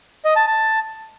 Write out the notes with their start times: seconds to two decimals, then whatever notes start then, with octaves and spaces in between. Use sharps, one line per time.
0.25 D#5
0.36 A5
0.47 A5